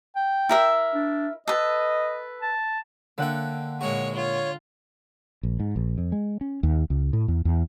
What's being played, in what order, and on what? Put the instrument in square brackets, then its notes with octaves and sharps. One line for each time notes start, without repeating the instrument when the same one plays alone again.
[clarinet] G5
[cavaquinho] E4 A#4 E5
[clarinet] D4
[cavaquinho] A4 B4 [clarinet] D#5
[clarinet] A5
[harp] D3 F#5 G5 [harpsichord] A#3 E5
[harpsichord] A#2 E4 F#4 [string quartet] G#3 C#5
[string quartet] F4 [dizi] C#5
[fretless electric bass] A#1
G#2
A#1
F2
G#3
C#4
D#2
C#2
A2
E2
E2